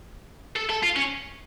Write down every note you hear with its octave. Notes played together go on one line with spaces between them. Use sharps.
A4
A4
F4
C#4